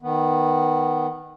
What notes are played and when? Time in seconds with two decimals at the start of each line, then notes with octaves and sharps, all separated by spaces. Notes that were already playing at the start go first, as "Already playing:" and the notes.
0.02 D#3 B3